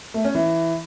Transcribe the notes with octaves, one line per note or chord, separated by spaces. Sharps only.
A3
C#4
E3